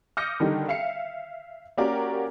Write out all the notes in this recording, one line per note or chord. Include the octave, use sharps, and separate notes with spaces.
D6 D#6 F6 G6 A#6 C#7
D3 D#3 G3 D#4
E5 F5 C7 C#7
A#3 C#4 F#4 G4 A#4 D5